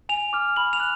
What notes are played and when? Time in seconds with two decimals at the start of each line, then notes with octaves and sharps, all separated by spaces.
0.09 G#5 F7
0.33 D6 F6
0.56 B5 F#7
0.73 F7
0.80 F#6